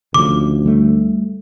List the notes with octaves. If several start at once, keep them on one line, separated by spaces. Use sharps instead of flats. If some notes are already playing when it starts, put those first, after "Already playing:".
D2 C#3 F3 D6
G3 A3